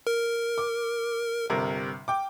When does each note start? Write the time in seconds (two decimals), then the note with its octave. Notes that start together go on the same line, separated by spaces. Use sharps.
0.07 A#4
0.58 D6
1.50 G1 C3 A#4
2.08 G5 D6